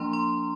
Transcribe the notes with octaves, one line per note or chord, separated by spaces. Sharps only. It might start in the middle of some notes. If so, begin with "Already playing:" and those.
Already playing: F3 A#3 D4 A#5 C6
C6